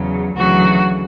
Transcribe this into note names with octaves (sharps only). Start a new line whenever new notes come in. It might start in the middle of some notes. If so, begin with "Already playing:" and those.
Already playing: E2 C#3 F#3
D2 C#3 E3 F#3 F#4